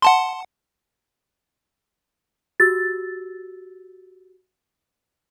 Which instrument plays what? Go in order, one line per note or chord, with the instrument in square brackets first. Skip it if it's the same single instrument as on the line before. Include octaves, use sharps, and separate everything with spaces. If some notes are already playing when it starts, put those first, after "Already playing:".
[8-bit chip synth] F#5 A5 C6
[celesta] F#4 G4 E6 [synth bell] A6